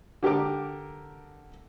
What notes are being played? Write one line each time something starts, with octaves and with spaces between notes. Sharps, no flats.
D3 G4 A#4 D6